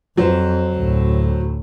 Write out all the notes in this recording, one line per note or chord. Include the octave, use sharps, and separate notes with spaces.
F2 F#3 C5
D2 A2